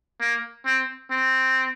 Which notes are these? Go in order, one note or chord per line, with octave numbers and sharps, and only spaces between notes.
A#3
C4
C4